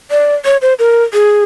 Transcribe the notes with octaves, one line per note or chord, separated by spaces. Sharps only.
D5
C#5
C5
A#4
G#4